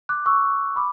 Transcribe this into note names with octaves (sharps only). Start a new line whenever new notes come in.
D6 F#6
C#6 E6
B5 D6